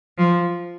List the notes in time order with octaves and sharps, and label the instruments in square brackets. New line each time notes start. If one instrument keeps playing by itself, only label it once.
[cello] F3